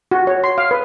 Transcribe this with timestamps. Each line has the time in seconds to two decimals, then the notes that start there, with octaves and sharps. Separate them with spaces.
0.11 F#4
0.27 C#5
0.44 C6
0.58 F5
0.71 B4